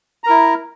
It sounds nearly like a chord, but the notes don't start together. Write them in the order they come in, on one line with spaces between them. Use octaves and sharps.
A#5 A#4 E4